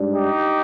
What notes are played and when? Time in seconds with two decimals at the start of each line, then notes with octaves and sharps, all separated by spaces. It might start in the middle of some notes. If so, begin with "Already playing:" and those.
Already playing: G#2 G3 D4
0.13 D#4 G4